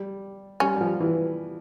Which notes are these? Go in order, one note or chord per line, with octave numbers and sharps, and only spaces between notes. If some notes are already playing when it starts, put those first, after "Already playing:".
Already playing: G3
G3 C#4
G3
F3
E3